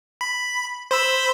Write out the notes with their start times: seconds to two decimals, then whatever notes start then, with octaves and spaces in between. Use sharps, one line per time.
0.21 B5
0.91 C5 B5 E6